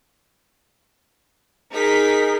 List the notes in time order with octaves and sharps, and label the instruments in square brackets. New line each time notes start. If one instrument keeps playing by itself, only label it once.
[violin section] D#4 B6 [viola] G#4 A#4